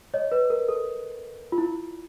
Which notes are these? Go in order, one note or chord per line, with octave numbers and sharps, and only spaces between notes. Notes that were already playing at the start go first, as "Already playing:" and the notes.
C#5 D#5
B4
A#4
A4
F4
E4